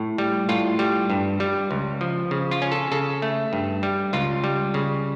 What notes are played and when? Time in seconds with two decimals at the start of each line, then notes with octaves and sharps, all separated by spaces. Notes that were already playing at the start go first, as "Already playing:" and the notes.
Already playing: A2
0.18 G3
0.49 A2 F4
0.79 G3
1.10 G2
1.40 G3
1.71 C#2
2.01 F3
2.31 C#3
2.51 F4
2.62 C#4
2.72 A4
2.92 C#3 A4
3.22 A3
3.53 G2
3.83 G3
4.13 C#2 F4
4.44 G3
4.74 C#3